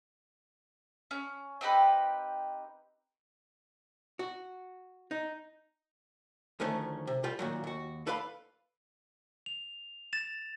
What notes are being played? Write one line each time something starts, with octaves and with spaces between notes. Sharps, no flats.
C#4
C4 D#4 G4 B4
F#4
D#4
D2 D#3 F3 A3 C#4
C3
G3 F4 G5
A#2 D#3 F#3
D#2 F#4
A4 B4 D5 F5 B5
F7
A6 E7